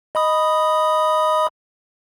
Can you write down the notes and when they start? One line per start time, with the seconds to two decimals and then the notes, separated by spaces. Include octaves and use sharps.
0.15 D#5 B5 D#6